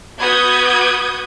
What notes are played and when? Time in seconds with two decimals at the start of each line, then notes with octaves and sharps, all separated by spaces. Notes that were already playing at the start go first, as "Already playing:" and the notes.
0.19 B3 F#4 B4 D#6 G6 G#6